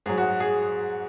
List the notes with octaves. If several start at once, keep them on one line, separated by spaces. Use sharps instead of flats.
G#2 F#3 G#4
F#4
G#4